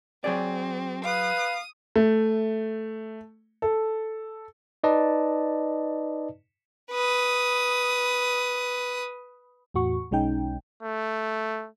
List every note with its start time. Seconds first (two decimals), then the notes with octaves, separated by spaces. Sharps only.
0.24 F#3 C4 G#4 D5
1.05 B4 F5 D#6
1.96 A3
3.62 A4
4.83 D#4 B4 D5 D#5 A5
6.91 B4 D#6
9.74 E2 A2 F#4 C#6
10.11 B1 G#3 C#4 D#4 G5
10.83 A3